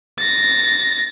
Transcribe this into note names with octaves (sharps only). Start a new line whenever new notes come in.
A6 A#6